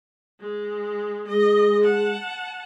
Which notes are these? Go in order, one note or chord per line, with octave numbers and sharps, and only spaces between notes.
G#3
G#3 D#5
F#5 A5